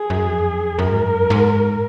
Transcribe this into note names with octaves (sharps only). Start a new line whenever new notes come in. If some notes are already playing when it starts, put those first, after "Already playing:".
Already playing: G#4
F#2
F2
F#2 A#4
G#2
F#2
G#2